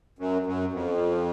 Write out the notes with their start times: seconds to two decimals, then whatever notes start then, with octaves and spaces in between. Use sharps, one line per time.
0.19 F#2
0.46 F#2
0.73 F2